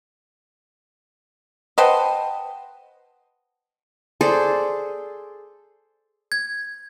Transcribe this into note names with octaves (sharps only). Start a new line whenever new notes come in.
B4 C5 D#5 F#5 G5 A5
G#4 A4 C5 D5
G#6